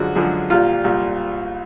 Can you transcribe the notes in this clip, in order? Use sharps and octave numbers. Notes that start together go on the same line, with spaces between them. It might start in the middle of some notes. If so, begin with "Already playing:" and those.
Already playing: F#2 D3 F3 G#3 F#4
F#2 D3 F3 G#3 G#4
C2 A#2 G3 F4
C2 A#2 G3